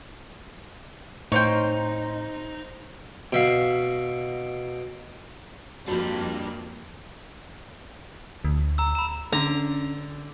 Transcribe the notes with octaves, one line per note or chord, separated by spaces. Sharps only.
A2 D#4 C5 C#5 F5 G5
B2 E5 F5
F2 G3 A#3 D4 F#4 B5
D2
A#5 E6
B5 E7
D3 C#4 A#5